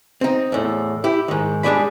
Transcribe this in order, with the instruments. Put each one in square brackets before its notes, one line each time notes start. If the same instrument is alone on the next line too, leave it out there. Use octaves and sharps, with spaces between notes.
[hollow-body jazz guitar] C4 D#4
E2 A2
E4 G4
G#2 D#3
G3 G#3 D4 G#4 D5 B5